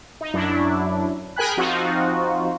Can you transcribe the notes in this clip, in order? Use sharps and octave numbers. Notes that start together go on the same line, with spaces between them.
D#4
F#2 F#3 D4 E4
G#4 A#4 G5 G#5 B5 F#6
F3 C4 D#4 F4 F#4